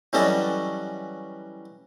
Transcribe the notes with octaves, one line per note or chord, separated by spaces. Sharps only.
E3 F#3 G3 C#4 A4 D#5